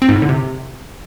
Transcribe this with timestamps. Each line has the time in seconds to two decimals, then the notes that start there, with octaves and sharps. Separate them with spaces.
0.02 C4
0.09 G#2
0.15 A2
0.22 D3
0.29 C3